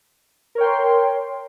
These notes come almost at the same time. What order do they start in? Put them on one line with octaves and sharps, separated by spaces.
A#4 C#5 G5 C6